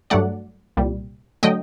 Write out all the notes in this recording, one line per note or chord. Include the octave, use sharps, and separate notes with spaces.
G2 F#3 A3 D5 F#5
C2 A#2 G3
D3 F#3 A3 D#5 G5